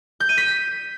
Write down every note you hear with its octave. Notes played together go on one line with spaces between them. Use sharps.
G6
D#7
B6